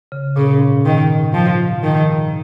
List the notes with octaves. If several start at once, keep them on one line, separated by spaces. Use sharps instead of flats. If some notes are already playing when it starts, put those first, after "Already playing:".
C#3
A#2 C#3
G#2
G#2 D#3
F3
G#2 D#3